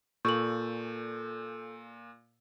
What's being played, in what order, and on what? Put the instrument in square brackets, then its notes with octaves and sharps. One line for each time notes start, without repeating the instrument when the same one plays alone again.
[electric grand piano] A#2 [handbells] A4 G6 [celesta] C#6 F#7